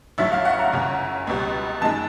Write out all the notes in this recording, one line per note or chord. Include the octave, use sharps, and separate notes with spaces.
A1 G2 D3 F#3 E5
F5
F#5
A#5
G1 F#2 C#3
C#2 B2 G3
F#2 D#3 G#3 A5